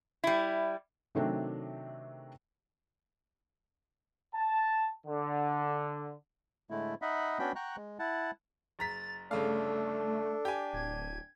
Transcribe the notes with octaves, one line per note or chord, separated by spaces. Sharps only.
G3 E4
C3 D#3 F#3 A3 C4 D4
A5
D3
A2 D3 G#3 A3 E4
D#4 D#5 E5 F#5 B5
B3 C#4 D4 F#4 G5 B5
F#5 G5 A#5 C#6 F#6
G#3
E4 F#5 A5
F#1 A#5 A6 B6
G1 C#3 A3 D4 A4 F5
G4 G#5
D1 G#6